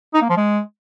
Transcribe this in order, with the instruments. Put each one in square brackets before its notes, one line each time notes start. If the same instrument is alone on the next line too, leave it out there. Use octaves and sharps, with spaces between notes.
[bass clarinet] D#4
A#3
F3
G#3